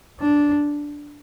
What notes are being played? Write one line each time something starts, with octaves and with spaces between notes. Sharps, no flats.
D4